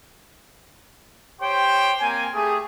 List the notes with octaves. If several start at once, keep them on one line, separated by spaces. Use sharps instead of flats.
G4 C5 C#5 G5 C6
A#3 C4 G#5
A3 G4 G#4